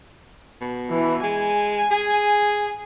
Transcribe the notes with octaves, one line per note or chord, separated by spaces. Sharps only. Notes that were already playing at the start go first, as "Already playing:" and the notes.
B2
E3
G#3 G#5
G#4